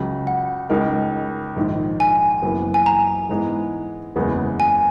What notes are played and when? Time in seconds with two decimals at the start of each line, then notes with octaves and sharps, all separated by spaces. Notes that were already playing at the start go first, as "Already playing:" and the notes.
Already playing: C#2 C#3 F#3
0.27 F#5
0.70 C#2 C#3 G#3 D#4 A#4
1.56 A#1 G#2 D#3
2.00 G#5
2.42 F#1 F#2 E3 B3
2.74 G#5
2.86 A#5
3.29 G#2 E3 G#3 B3
4.16 F#1 E2 C#3 G#3 B3
4.60 G#5